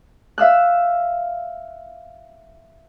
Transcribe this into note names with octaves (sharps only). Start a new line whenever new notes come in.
E5 F5 E6 F#6